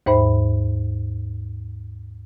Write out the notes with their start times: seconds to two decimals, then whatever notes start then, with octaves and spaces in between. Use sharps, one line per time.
0.06 D#2 G#2 C5 E5 B5